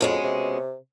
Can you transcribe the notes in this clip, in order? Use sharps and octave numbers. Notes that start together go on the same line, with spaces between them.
F2 B2 G#3 C#4
C3